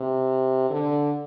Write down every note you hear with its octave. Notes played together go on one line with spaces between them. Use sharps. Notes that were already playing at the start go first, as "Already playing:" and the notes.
Already playing: C3
D3